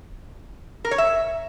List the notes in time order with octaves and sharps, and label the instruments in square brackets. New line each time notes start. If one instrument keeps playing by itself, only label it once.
[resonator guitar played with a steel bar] A#4
C#5
E5